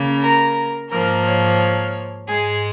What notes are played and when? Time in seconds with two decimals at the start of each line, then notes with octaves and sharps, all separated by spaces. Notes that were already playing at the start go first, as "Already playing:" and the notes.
Already playing: C#3 A#3
0.21 A#4
0.90 G#2 F3 A#3 A#4
1.25 C#5
2.29 G#2 G#3 G#4